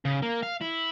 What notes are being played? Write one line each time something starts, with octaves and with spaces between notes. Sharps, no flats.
C#3
A#3
F5
E4